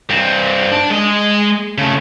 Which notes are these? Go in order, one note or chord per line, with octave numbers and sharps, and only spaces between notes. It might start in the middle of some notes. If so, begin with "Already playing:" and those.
G2 C4
D4
G#3 D#5
C#3 A3